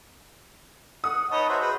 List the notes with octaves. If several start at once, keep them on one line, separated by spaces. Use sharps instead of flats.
F#5 D#6
D#4 B4 C#5 D#5 A5
F#4 B4 C5 E5 G#5
G#4 B4